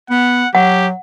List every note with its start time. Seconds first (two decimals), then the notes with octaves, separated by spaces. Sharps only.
0.10 B3 F#5
0.55 F#3 G4 F#5